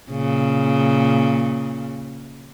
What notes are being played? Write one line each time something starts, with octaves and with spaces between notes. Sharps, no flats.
A#2 C#3